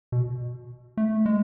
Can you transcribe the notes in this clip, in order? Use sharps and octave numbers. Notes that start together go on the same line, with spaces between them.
B2
A3
G#3